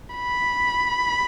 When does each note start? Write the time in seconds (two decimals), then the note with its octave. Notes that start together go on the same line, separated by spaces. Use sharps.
0.15 B5